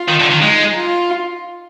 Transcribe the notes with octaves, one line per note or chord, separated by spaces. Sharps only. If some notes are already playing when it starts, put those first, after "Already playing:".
Already playing: F4
D#3
D3
D#3
G#3 D#4
F4